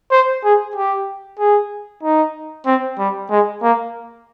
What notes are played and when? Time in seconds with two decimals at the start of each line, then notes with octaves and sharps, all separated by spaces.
0.11 C5
0.44 G#4
0.76 G4
1.39 G#4
2.03 D#4
2.66 C4
2.99 G3
3.30 G#3
3.62 A#3